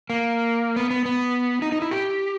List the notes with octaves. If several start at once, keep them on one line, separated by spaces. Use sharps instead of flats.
A#3
B3
B3
B3
D#4
D#4
E4
G4